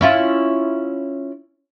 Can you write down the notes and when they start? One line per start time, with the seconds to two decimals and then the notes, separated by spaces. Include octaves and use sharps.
0.01 C#4 E4 F4